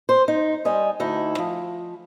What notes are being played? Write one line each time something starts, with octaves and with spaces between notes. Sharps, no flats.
C5
D#4
G3 D#5 G#5
D2 D#4 E4
F3